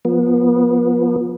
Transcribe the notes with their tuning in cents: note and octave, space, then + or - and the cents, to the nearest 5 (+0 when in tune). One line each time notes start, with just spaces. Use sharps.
F3 +10 B3 -30